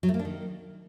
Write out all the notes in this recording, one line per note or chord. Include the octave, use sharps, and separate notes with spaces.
F#3
A3
A#3
D4
D#3